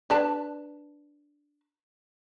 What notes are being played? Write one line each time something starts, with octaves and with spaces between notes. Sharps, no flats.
D4 B4 A5